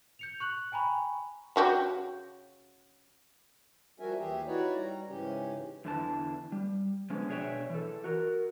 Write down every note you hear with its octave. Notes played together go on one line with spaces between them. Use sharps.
G6 C#7 F7
C#6 F#6 F#7
G5 G#5 A#5 B5 C#6
C#3 F#4 G4
F3 G3 F#4 A#4 E5 G#5
D#2 E3 G4 G#4 E5
D#4 E4 F#4 B4 C#5 D5
G3 A#5
G#2 C#3 E3 C#4 G4
E2 D3 E3 A5
G3
D3 F3 G#3 B3 C#4
B2 D4 G#4 C#5 E5 G5
E3 A4
F#4 A#4